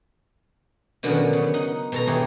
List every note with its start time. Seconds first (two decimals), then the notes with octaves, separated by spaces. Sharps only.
1.03 B2 D3 D#3 F3 F#3 C#4
1.33 C#3 B3
1.54 D#4 F#5
1.92 B2 A4 A#5
2.07 E3 E4 G4 G#4 C#5 D#5